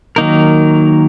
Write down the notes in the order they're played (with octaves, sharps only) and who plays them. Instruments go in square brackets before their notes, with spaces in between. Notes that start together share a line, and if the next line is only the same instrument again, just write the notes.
[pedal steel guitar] D#3 F#3 A#3 D#4 A#4